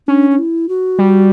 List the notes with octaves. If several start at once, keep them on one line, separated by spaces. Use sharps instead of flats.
C#4 D4
D4
E4
F#4
G3